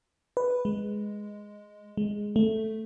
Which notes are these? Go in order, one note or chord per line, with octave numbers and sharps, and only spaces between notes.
B4
G#3
G#3
A3